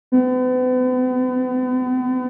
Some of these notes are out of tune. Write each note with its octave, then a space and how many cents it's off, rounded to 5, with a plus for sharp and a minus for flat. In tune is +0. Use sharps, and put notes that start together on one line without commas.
B3 +45